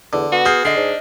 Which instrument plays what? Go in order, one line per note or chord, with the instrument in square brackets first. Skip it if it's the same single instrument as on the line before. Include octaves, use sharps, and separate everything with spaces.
[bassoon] E2 [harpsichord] D3
[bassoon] B3 [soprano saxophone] F#4
[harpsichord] G#4 [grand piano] F6 G6 C7
[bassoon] D3 [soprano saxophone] D4 [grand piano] D#5 C7
[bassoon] G#2